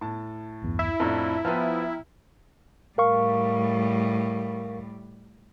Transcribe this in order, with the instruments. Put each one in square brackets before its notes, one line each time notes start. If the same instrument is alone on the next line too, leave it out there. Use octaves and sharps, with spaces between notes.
[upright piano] A2 A5
[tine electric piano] B1 E2 G2
[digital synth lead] E4
[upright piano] F2 A2 D4 [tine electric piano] A5 A#5
[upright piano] F3 B3 [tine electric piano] G5 A#5 F6
[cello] A2 G3 [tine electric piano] A#4 F5 C#6